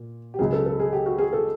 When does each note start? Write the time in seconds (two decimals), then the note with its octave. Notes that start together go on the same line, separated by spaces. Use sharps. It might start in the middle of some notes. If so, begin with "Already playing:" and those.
Already playing: A#2
0.34 G4
0.39 C#2 C#3 F#3 G#4
0.53 A4
0.66 A4
0.80 G#4
0.93 G4
1.06 F#4
1.19 G#4
1.33 A4